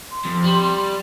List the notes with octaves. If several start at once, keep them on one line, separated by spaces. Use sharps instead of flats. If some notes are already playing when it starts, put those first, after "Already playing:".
C6
F2
G3